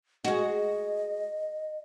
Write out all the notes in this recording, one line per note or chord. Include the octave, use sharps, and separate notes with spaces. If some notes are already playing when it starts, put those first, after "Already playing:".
G#3 F#4 D#5